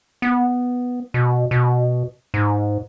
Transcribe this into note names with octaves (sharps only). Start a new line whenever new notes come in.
B3
B2
B2
G#2